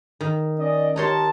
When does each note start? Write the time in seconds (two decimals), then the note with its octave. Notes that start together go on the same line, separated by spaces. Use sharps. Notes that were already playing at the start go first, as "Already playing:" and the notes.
0.21 D#3
0.59 C#4 D5 D#5
0.96 D#4 G4 A#4 C#5 A5 C6